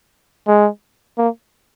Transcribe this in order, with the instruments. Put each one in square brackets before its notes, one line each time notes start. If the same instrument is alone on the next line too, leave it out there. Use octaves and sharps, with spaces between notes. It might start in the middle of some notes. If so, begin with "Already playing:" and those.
[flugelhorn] G#3
A#3